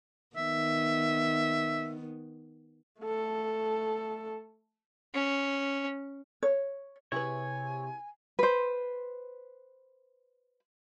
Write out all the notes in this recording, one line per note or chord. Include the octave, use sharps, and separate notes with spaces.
D#3 B3 E5
A3 A4
C#4
C#5
C3 E4 G#4 B4 C#5 G#5
B4 C5